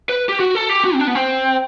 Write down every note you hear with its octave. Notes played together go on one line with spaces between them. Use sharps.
B4
G4
F#4
A4
G4
F#4
C4
D4
B3
C4